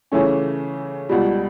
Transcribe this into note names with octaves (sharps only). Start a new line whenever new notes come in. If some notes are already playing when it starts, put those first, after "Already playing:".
C#3 E3 A3 C#4
C#2 B2 G3